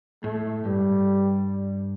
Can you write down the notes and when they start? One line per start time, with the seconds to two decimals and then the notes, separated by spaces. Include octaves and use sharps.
0.24 A2 A3
0.65 G2 G3